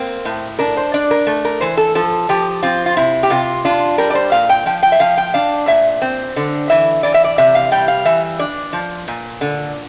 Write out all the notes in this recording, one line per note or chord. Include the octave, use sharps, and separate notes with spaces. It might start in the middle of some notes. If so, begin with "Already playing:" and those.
Already playing: A#3 C4
A2
D4 A#4
C5
D4 D5
A#4
A3
A#4
E3 C5
A4
F3 A4
F3 G4
C4 F4
F4
C3 E4
G4
C3 F4
D4 F4
G3 A#4
D5
C5
A#2 F5
G5
F3 G5
G5
E5
F3 F5
G5
D4 F5
A#2 E5
C4
D3
E3 E5
E3 D5
E5
D5
C3 E5
F5
G3 G5
F5
E3 E5
D4 D5
F3
A#2
D3